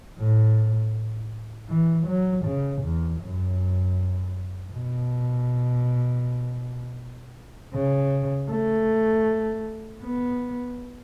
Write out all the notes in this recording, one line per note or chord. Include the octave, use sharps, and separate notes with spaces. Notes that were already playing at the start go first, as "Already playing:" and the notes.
A2
E3
F#3
C#3
E2
F#2
B2
C#3
A3
B3